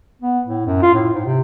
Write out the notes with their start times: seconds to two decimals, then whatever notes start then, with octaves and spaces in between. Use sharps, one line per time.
0.22 B3
0.47 A2
0.67 F#2
0.82 F4
0.94 A2
1.15 G#2
1.26 C3